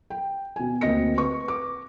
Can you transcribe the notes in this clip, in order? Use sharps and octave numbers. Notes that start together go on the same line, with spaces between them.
G5
B2 G#5
D2 A#3 C4 D#5 A#6 C#7
B4 C#6
D6